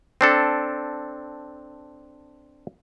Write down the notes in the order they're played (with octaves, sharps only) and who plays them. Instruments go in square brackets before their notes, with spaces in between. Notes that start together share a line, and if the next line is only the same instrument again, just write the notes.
[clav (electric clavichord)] C4 D4 A4